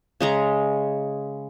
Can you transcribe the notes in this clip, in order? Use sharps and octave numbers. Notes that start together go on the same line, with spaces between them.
C#3 G#3 A#5